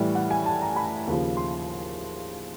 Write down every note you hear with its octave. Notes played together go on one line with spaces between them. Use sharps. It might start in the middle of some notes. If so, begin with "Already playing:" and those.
Already playing: A2 E3 G3
F#5
G#5
A5
A#5
B5
D#2 C#3 F3
C6